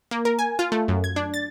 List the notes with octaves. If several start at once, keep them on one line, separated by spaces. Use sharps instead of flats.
A#3
A#4
G#5
F4
A3
F#2
G#6
D4
A6